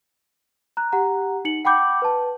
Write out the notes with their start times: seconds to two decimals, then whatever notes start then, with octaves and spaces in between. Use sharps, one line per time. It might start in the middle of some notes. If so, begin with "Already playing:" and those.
0.77 A#5 F#6
0.92 G4 F#5 A#5
1.45 D#4 C#7 F#7
1.65 F#5 G5 B5 D6 G6
2.02 B4 A5